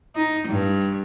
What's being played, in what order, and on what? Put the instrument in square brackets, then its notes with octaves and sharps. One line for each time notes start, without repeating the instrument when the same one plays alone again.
[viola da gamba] D#4
G2